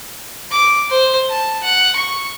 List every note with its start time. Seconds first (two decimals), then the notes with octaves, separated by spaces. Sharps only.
0.51 D6
0.90 C5
1.30 A5
1.63 F#5
1.96 C#6